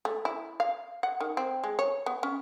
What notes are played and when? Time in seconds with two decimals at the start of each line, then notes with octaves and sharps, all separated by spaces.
0.05 A3
0.25 E4
0.60 F5
1.03 F#5
1.21 D#3
1.37 C4
1.64 G#3
1.79 C#5
2.06 B3
2.23 C#4